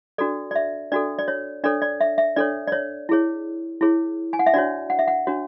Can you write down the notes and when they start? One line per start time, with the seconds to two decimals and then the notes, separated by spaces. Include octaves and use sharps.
0.18 D4 F#4 A4 D5
0.51 D5
0.55 E5
0.92 D4 F#4 A4 D5
1.19 D5
1.28 C#5
1.64 D4 A4 C#5 D5
1.82 D5
2.01 E5
2.18 E5
2.36 D4 A4 C#5 D5
2.67 D5
2.72 C#5
3.09 E4 G#4 C#5
3.81 E4 G#4 C#5
4.33 G#5
4.39 F#5
4.46 E5
4.54 D4 F#4 C#5 D5
4.90 F#5
4.99 E5
5.08 F#5
5.27 D4 F#4 C#5